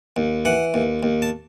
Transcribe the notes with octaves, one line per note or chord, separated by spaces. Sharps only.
D#2
E3 F#5
D#2
D#2
A5